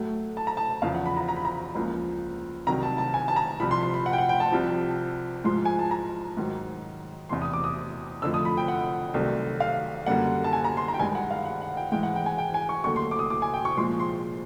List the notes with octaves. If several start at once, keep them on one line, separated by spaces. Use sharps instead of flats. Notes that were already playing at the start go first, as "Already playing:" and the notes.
Already playing: A2 F#3 A3
A5
A#5
A5
E2 C#3 F3 F5
F#5
B5
A#5
A#5
B5
A#5
C#2 C#3 F3 A#3
C2 C3 D#3 F#3 A#5
A5
A5
G#5
A5
A#5
C2 C3 F3 B5
C6
C6
B5
F#5
G5
F#5
G5
A5
C2 C3 F3
G#2 F3 G#3 C6
G#5
A5
A#5
G#2 D#3 F#3
E2 C3 E3 C6
D#6
D6
D#6
F2 D3 F3 A3 E6
D#6
B5
G5
F#5
C2 C3 D#3 F#3 A3
F5
F#2 D3 G3 A#3 F#5
A5
G#5
A#5
C6
A#5
G5
G2 D#3 G#3 G#5
F#5
F5
F#5
F#5
G5
G#2 E3 G#3 G5
F#5
G5
G#5
G5
G#5
C#6
D#2 D3 F#3 A3 C#6
C6
D6
D#6
D6
G#5
G5
C#6
A#2 F3 G#3 C6
C6